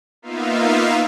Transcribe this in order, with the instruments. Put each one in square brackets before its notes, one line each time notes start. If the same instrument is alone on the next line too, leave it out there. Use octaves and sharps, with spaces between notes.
[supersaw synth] A#3 B3 D#4 F4 E5 F5